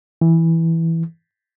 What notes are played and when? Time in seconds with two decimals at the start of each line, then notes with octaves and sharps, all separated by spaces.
0.21 E3